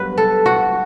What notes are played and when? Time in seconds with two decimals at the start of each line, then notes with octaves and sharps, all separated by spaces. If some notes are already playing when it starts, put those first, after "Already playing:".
Already playing: G2 F#3 B3 B4
0.18 A4
0.46 F#4